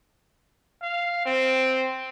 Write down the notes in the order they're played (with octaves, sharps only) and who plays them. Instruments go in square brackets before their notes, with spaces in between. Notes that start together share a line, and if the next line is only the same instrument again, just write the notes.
[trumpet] F5
C4